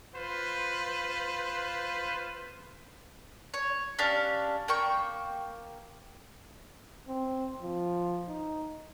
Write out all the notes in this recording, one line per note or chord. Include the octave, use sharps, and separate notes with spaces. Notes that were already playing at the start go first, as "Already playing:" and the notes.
F4 B4 C5
C#5
C#4 D4 G4 F5
A#3 G5 C#6
C4
F3
D#4